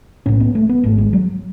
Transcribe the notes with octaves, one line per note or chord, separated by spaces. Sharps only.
B1 A2 C#4
B3
A3
B3
G#1 G#2 A3
G#3
F#3